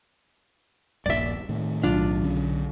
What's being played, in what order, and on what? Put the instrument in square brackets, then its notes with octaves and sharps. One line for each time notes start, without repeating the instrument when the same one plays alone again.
[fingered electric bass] D#1 A#1 G2 [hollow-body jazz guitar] D5 E5
[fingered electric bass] A2 D#3
[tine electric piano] B1 [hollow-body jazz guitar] D4 F4
[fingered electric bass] D3 C#4